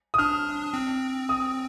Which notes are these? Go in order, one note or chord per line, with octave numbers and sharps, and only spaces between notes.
D#6
D4 F6
C4
D#6